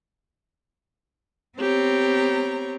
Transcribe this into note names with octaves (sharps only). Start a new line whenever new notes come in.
B3 C4 G4 C#5 A#5